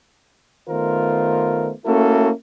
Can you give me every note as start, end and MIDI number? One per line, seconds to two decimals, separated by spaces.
0.69 1.71 51
0.69 1.71 57
0.69 1.71 59
0.69 1.71 65
0.69 1.71 70
0.69 1.71 72
1.85 2.30 57
1.85 2.30 58
1.85 2.30 61
1.85 2.30 64
1.85 2.30 66
1.85 2.30 69